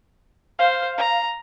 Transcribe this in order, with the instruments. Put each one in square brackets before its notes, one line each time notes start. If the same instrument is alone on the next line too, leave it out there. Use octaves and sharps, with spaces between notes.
[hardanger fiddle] C5 [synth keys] F5
[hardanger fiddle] A#5